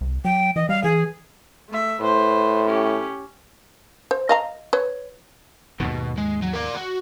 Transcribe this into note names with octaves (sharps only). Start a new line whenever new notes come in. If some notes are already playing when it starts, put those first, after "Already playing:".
C2
F#3 G5
E3 D#5
G3 F5
E3 G#4
A3 E5
A2 B4 C5
C#4 G4
C5
D#5 F5 A#5
B4 C#5
D#2 G#2 B2 D#3
G#3
F#3
A#4 D5
F#4